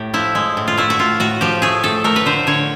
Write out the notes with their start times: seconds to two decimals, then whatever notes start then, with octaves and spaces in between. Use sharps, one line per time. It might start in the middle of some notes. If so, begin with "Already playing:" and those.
Already playing: A2 G4
0.14 F3 E4
0.35 G#3
0.57 A2
0.67 F4
0.77 A3 E4
0.90 F#4
0.99 A2 F4
1.20 A2 F#4
1.41 F3 G4
1.62 A3 G#4
1.84 A2 A4
2.04 A3 A#4
2.16 B4
2.26 D3 C5
2.47 D3 C#5